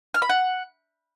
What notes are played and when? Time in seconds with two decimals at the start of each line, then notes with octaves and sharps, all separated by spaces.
0.14 F6
0.22 B5
0.29 F#5